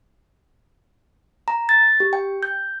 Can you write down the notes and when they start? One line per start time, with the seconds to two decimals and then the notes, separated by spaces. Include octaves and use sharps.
1.48 A#5
1.69 A6
2.00 G4
2.13 G5
2.43 G6